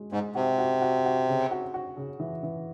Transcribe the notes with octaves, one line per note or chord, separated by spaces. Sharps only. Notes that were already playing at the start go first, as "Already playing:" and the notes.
Already playing: G#3 F#4
G#2 G#3
C3 F#4
F#4
F#4
F#4
C#3
F#4
F#4
C#3
E3
E3